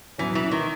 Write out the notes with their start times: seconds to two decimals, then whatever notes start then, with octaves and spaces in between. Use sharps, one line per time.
0.18 E2 B2 E3 F#3 C#4
0.35 E3
0.51 D#3